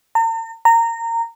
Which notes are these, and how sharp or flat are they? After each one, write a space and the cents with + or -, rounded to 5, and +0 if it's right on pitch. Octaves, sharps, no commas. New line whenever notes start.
A#5 -45
A#5 -20